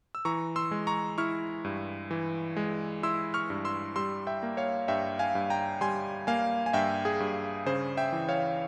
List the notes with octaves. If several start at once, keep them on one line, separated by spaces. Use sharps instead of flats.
E6
E3 A#5 C#6
C6 E6
G#3
A#5 C#6
E4 C#6 F6
G2
E3
G#3
E4 C6 E6
C#6 F6
G2
C6 E6
G3 C6 E6
E5 G5
A#3
C#5 F5
G2 E5 G5
F5 G#5
G2
G5 A#5
G3 G#5 C6
A#3 F5 G#5
G#5
G2 E5 G5
G#4
G2
C#3 G#4 C5
E5 G5
E3
C#5 F5